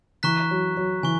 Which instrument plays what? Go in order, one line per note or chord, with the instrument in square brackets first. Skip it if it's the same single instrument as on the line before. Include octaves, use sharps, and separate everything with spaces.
[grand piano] E3 [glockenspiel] A#5 C#6 F#6 B6
[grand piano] F#3
F#3
[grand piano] E3 [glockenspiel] G#5 C#6